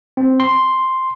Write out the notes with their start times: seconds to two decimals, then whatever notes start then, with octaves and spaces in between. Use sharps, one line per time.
0.17 C4
0.40 C6